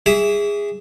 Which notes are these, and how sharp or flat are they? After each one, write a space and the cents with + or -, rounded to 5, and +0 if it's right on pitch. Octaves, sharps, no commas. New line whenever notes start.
G#4 -15 E5 +0 D6 -40